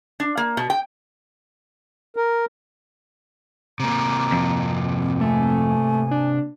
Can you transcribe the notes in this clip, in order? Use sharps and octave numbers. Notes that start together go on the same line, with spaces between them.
D4
A#3
B2
G5
A#4
C3 A#3 A#5
F2
A3 G#5
D4